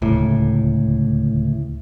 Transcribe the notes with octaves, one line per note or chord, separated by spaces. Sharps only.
D1 C#2 A2